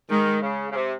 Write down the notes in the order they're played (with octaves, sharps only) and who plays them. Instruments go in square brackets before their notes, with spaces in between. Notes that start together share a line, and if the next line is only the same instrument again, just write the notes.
[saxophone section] D#3 [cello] G#3
[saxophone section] C#3
C#3
C3